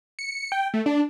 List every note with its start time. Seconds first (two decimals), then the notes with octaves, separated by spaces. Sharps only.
0.19 C#7
0.52 G5
0.74 A3
0.86 D4